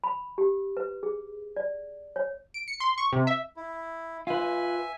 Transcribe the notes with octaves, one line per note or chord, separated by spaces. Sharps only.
B5
G4
B4
G#4
D5
C#5
D7
C#7
C6
C#6
C3
E5
E4
F4 B4 E5 G#5